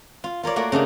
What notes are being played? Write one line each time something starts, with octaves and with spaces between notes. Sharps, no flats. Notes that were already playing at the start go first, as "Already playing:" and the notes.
F4
F4 A#4 C#5 D5
A3 A#3 F#4 D5
C#3 A3 D4 D#4